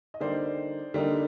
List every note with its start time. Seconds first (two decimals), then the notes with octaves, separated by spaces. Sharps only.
0.14 D#5
0.20 D3 G3 A#3 D#4 C5 D5
0.94 D3 G3 A#3 D#4